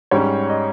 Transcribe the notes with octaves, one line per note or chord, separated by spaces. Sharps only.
G#2 G3 C#4 C#5
D#5